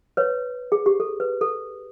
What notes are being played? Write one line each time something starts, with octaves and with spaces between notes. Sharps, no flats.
B4 C#5
G#4
G4
A4
B4
A4